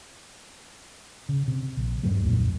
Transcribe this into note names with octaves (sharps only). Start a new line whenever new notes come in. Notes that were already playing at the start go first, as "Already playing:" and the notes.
C#3
C3
A#1
E2 G2 F#3 A3
C2 F2 A#2